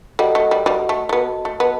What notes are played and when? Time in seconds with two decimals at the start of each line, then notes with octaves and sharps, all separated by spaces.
0.19 G3 F#4 A4 D#5 F#5
0.35 A3
0.51 G3
0.66 G3 F#4 A4 D#5 F#5
0.89 A3
1.09 A3
1.13 B3 F#4 A4 D#5 A5
1.45 A3
1.60 B3 F#4 A4 D#5 A5